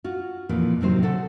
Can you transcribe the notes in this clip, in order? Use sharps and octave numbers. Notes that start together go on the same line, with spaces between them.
F4 F#4
F2 A#2 E3
D#2 A2 C3 F#3 D#4 C5
C#3 F#4 A4 F#5